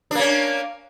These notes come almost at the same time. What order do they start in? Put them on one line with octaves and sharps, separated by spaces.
D4 A#3 C#4